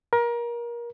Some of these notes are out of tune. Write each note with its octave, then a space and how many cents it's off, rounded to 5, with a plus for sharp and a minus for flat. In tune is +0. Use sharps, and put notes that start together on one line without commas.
A#4 +25